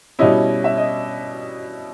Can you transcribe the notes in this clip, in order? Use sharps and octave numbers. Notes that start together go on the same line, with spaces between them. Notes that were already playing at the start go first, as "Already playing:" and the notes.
B2 G3 C#4 E4 D#5
E5
D#5